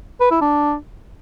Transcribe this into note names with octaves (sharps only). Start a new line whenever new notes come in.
B4
E4
D4